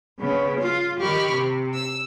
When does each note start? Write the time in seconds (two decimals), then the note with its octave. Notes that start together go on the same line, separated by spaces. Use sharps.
0.20 C#3 B3
0.60 F4
1.00 D#3 G4 B5 C#6 F6
1.30 C3
1.73 E6